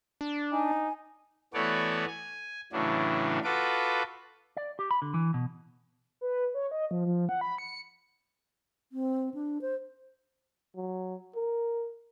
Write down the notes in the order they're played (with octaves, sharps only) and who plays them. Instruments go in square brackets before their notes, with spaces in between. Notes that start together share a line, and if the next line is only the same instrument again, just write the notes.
[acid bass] D4
[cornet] D#4 [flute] G#5
[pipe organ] E3 A3 B3 F#4 C#5 D5
G#5
A2 C#3 E3 F#3 D4
F4 F#4 A4 B4 D6
[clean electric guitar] D5
G4
B5
D3
E3
B2
[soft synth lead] B4
C#5
D#5
F3
F3
F#5
B5
C#7
[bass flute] C4
D4
C5
[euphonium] F#3
A#4